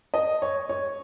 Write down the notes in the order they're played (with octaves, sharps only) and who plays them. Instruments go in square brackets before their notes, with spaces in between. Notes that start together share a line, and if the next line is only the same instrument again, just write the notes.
[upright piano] D#5
C#5
C#5